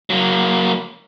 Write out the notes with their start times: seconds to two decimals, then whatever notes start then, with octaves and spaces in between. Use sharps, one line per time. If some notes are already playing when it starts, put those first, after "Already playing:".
0.10 F#3 A#3